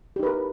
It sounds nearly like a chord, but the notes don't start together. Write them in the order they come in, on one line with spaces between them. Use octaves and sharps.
G4 D#4 B4 A#4